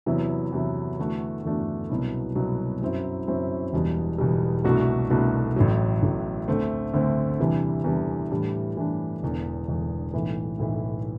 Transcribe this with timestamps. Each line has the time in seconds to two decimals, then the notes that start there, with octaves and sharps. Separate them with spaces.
0.06 E2 C3 F#3 B3 E4
0.53 E2 C3 F#3 B3 E4
0.98 E2 D3 A3 D4 F#4
1.44 E2 D3 A3 D4 F#4
1.89 C2 B2 F#3 B3
2.35 C2 B2 F#3 B3
2.81 F#2 F#3 C4 E4
3.27 F#2 F#3 C4 E4
3.73 E1 E2 B2 G3
4.18 E1 E2 B2 G3
4.64 C2 B2 A3 D4 F#4
5.10 C2 B2 A3 D4 F#4
5.56 A1 A2 F#3
6.02 A1 A2 F#3
6.48 D2 D3 A3 C4
6.94 D2 D3 A3 C4
7.39 E2 C3 E3 G3 D4
7.84 E2 C3 E3 G3 D4
8.31 A2 E3 G3 D4
8.76 A2 E3 G3 D4
9.23 E1 E2 D3
9.68 E1 E2 D3
10.14 B1 A2 E3
10.59 B1 A2 E3